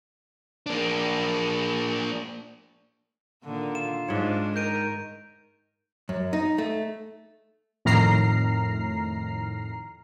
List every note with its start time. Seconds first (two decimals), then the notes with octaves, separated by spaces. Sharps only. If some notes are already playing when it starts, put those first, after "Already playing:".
0.66 A#3 D4
3.44 A#2 D3 D#3
3.75 F4 E7
4.08 G#2 G#3 D4 C#5
4.56 D#3 A#4 G6 D7 D#7
6.09 F#2
6.33 D#4
6.58 A3
7.85 F2 A2 D#3 A#5 F6 C7